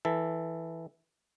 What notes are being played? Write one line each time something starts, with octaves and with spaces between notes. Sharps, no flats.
E3 A4